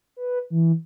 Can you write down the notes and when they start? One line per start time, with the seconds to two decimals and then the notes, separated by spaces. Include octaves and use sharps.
0.17 B4
0.50 E3